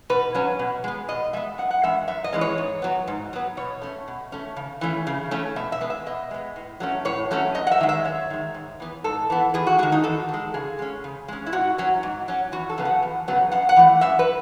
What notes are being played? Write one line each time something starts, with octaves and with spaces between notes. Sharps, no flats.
B2 B4
F#3 C#4
B2
G#3 B3
B2 D#5
G#3 B3 E5
F#2 F#5
F#5
E3 G#3 C#4 E5
F#2 E5
D#5
E3 G#3 C#4
C#5
G#2
F#3 B3
G#2
F#3 B3
B2 C#5
A3 C#4
B2
A3 C#4
C#3
E3 A3 C#4
C#3
E3 A3 C#4
B2 E5
E5
G#3 B3
E5
B2 D#5
G#3 B3
A2
F#3 A3 C#4
A2 C#5
F#3 A3 C#4
F#2 D#5
F#5
E5
D#3 G#3
E5
F#2 C#5
D#3 G#3
G#2
E3 B3
G#2 A4
E3 B3
E2 G#4
F#4
D#3 G#3 F#4
D#4
E2 A4
D#3 G#3
C#3 G#4
G#3 C#4
C#3
G#3 C#4
E4
G#2 F#4
F#3 C#4
G#2
F#3 C#4
E2 F#4
A4
C#3 F#3 B3
F#5
E2
C#3 F#3 B3
F#2 F#5
F#5
E3 A3
F#2 E5
B4